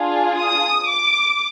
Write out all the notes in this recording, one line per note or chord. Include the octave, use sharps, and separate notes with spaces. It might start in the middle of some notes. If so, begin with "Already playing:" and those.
Already playing: D4 F4 G#4
D#6
D6